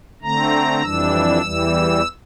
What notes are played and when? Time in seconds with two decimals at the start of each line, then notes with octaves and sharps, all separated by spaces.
0.22 D3 A3 C4 A#5
0.82 F2 E3 G3 D4 E6
1.42 E2 E3 G3